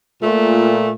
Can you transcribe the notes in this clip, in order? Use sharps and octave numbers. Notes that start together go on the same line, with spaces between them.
A#2 A3